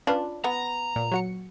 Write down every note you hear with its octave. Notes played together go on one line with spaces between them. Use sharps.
C#4 D4 F4 B4
B3 F#5 A#5
A#2
F#3 F#4 C#7